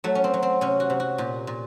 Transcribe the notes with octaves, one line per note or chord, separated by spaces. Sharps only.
F#3 A3
C#4
C4
F#3
C4
C3 C#4
F#4
C3
F#4
A#2 G4
A#2